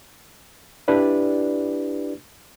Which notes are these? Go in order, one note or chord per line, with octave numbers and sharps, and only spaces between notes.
D4 E4 G4 B4 D5